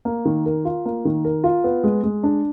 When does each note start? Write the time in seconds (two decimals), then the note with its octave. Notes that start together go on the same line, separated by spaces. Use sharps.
0.05 A#3
0.25 D#3
0.46 A#4
0.65 F4
0.85 A#3
1.05 D#3
1.25 A#4
1.44 F4
1.64 B3
1.84 G#3
2.04 G#3
2.23 D4